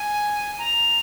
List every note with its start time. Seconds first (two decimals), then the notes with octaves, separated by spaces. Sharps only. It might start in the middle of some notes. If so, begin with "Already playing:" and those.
Already playing: G#5
0.59 A#5